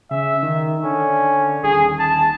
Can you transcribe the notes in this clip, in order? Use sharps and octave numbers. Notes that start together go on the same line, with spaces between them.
C#3 E5
D#3
D3 C#4
D#1 G#4
A5